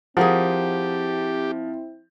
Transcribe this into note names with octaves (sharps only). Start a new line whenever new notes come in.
F3 C4 E4 G4 G#4 A#4 F#5